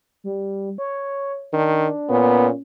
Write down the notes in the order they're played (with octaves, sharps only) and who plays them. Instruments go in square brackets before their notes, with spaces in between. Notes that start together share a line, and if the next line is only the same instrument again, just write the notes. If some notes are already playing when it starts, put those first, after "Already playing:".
[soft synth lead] G3
C#5
[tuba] D#3 [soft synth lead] D4
[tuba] A#2 [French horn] B3 [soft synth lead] C#4